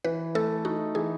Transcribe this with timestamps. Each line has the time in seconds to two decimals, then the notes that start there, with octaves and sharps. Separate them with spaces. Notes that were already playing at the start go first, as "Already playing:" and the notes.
0.05 E3 B4
0.35 A3 A4
0.65 D#4 F#4
0.95 E3 G#4